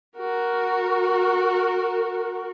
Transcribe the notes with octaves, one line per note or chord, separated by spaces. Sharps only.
F#4 A#4